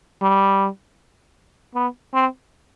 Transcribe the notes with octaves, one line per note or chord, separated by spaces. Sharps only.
G3
B3
C4